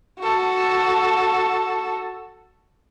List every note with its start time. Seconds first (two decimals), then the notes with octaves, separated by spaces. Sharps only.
0.19 F#4 A4